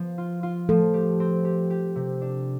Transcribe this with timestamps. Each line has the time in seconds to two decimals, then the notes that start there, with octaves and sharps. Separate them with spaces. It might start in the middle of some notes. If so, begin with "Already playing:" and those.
Already playing: F3 B3
0.18 F4
0.43 F4
0.69 F3 A3 A4
0.94 G4
1.20 C4
1.45 G4
1.70 G4
1.96 C3
2.22 D4